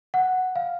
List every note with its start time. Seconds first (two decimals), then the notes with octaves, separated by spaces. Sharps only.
0.14 F#5
0.56 F5